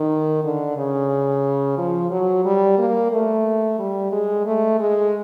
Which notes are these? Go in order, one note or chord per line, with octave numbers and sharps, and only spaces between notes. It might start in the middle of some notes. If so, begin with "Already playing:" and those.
Already playing: D#3
D3
C#3
F3
F#3
G3
A#3
A3
G3
G#3
A3
G#3